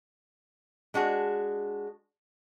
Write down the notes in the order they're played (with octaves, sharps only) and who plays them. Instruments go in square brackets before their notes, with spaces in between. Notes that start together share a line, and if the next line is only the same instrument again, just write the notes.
[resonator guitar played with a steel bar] G#3 D4 F#4 G#4